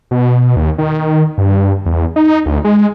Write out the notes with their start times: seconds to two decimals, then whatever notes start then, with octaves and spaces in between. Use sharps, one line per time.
0.11 B2
0.56 D#2
0.78 D#3
1.38 G2
1.86 E2
2.16 D#4
2.46 D2
2.65 G#3